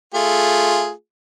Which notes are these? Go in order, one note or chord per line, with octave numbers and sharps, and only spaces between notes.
A3 F4 G#4